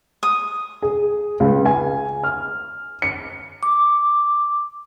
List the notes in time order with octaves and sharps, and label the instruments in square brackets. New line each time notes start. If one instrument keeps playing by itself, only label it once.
[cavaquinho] D#6
[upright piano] G#4
C#2
G#5
F6
C#7
[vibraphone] D6